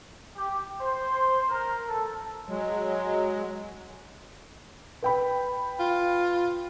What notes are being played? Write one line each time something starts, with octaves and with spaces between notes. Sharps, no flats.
G4
C5
A#4
A4
F#3 G#3
B4 G5 B5
F4